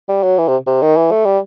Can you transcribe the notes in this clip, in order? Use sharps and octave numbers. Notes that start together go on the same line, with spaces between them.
G3
F#3
E3
C3
C3
D#3
E3
A3
G3